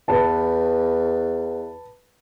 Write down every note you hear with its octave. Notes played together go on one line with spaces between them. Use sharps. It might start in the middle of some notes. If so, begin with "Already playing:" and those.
E2 B4 A5